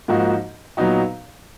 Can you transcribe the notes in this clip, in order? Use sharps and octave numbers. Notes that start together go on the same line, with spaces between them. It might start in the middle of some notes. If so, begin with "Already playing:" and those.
G#2 F3 A#3 D#4 F#4
A#2 F#3 B3 D#4 F#4